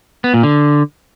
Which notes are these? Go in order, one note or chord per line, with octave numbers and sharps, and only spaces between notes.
B3
A#2
D3